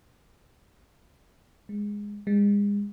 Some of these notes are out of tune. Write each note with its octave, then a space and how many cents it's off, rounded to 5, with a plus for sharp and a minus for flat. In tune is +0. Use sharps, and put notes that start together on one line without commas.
G#3 -10
G#3 -35